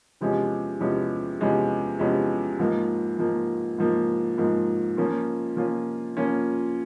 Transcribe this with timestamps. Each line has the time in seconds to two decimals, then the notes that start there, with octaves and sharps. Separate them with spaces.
0.21 E2 C3 F3 G#3 C#4
0.80 E2 C3 F3 G#3 C#4
1.40 E2 C3 F3 G#3 C#4
1.99 E2 C3 F3 G#3 C#4
2.59 G#2 F3 A#3
3.18 G#2 F3 A#3
3.78 G#2 F3 A#3
4.38 G#2 F3 A#3
4.97 F3 A#3 C#4 F4
5.57 F3 A#3 C#4 F4
6.17 F3 A#3 C#4 F4